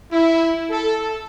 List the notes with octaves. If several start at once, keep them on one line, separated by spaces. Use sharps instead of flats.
E4
A4